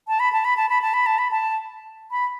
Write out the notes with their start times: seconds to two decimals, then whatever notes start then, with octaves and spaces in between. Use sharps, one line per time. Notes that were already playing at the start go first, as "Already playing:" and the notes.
0.08 A5
0.20 B5
0.33 A5
0.45 B5
0.57 A5
0.69 B5
0.82 A5
0.94 B5
1.06 A5
1.18 B5
1.31 A5
2.11 B5